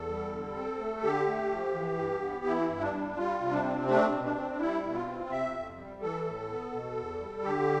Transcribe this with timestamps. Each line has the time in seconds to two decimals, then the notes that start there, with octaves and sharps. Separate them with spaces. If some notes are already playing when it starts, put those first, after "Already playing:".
Already playing: E2 A4
0.08 G3
0.32 D3
0.56 C4
0.79 A3
1.03 D3 G4
1.27 A3
1.51 F3
1.74 E3
1.98 G2
2.22 B3
2.46 E3 E4
2.69 G2
2.81 D4
2.93 G3
3.17 G3 F4
3.40 C3
3.52 D4
3.64 C4
3.88 A3 D4
4.12 B2
4.24 D4
4.36 C4
4.59 G3 E4
4.83 B2
4.94 F4
5.07 C4
5.30 C3 E5
5.54 F2
5.77 G3
6.02 E3 A4
6.25 A2
6.48 B3
6.72 B2
6.96 E2
7.20 G3
7.43 D3 G4